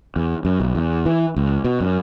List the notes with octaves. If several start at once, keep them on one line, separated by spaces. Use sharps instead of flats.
E2
F#2
B1
E2
E3
C#2
B2
F#2